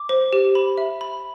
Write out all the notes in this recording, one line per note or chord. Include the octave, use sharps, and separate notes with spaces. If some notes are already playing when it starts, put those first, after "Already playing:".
Already playing: D6
C5
G4
B5
E5
B5